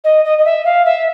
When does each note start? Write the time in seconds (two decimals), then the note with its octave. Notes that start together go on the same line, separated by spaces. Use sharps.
0.04 D#5
0.24 D#5
0.38 D#5
0.45 E5
0.65 F5
0.85 E5